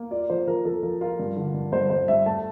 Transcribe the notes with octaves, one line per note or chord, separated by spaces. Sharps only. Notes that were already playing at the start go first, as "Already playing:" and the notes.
Already playing: A#3
F4 D5
F3 C5
F3 A#4
F3 A4
F3 A#4
F4 A#4
G2
D3
G2
G2 C5
G2 C5
G2 E5
A3 A5